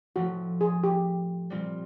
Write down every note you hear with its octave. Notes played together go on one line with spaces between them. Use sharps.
A2 F3 A3 F#4
G#4
G4
A#2 G3 C4 F4